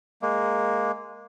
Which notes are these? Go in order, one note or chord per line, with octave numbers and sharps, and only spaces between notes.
G#3 A#3